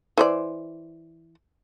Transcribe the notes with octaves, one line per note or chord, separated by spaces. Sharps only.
E3 C5 D5